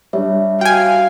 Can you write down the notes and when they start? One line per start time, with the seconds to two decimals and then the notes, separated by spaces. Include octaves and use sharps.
0.13 G3 D4 C#5 E5
0.61 F#4 F5 G5 G#5